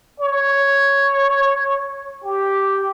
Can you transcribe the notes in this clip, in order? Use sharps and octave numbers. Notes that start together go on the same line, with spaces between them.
C#5
G4